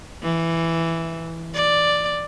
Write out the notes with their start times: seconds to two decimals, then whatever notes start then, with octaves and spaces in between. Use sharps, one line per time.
0.23 E3
1.54 D5